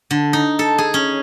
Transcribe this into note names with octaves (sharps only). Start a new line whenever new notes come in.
D3
D#4
A4
G#4
C#4